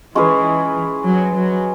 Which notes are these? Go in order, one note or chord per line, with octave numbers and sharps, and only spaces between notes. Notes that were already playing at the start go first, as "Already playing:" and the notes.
E3 G#3 C#4 G#4 B4
F#3
F#3